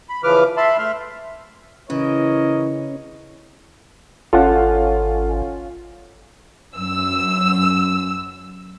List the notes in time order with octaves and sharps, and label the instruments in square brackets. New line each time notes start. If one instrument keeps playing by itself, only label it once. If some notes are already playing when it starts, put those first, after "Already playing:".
[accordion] B5
C#3 E3 F3 B4 D6 F6
E5 A5 B5 C6
A3 E5 C6 F6
[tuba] C#3 [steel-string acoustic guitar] E3 [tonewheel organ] C#4 [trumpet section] A#4 C#5 D#5
[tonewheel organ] G#1 [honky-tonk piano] C#4 F4 [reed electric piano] A4 F#5
[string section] F#2 E6